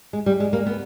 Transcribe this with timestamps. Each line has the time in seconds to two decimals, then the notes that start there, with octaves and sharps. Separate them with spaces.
0.13 G#3
0.26 G3
0.40 G#3
0.53 A#3
0.66 B3